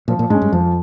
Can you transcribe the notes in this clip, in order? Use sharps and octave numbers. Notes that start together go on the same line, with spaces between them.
A#2 F3
A#2
G#2 G#3 C#4
G2
F2 F3